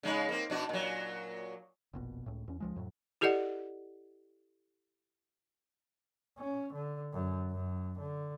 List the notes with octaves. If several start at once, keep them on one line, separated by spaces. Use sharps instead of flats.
C#3 G#3 D#4
A#3 C4
B2 D4 F#4
A#2 F#3
F1 A#1 B2
C#2 A2
E2 C#4
C#2 F3 G#3
F2 A2 F#3
E4 G4 A4 D5 D#5 F#5
C#4
D3
F#2
F#2
D3